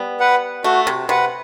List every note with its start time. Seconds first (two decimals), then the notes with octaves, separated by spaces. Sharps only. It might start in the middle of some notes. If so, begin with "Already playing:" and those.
Already playing: G3 B3
0.20 B4 F#5
0.64 A3 F#4
0.87 C3
1.09 C3 B4 F#5